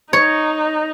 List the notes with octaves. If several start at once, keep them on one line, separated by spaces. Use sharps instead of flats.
D#4 C#5